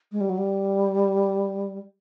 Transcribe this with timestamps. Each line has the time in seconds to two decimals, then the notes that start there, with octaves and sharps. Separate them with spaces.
0.12 G#3
0.21 G3
0.29 F#3
0.38 G3